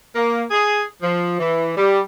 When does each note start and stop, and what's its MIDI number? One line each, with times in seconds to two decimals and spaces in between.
0.15 0.43 58
0.51 0.83 68
1.03 1.39 53
1.40 1.71 52
1.77 2.00 55